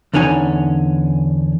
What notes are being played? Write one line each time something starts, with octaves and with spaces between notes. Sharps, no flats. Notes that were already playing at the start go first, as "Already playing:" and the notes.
E2 D3 C#4 D#4 G#5